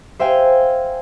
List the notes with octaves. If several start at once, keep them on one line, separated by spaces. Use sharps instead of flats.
C5 E5 F5 G5 G#5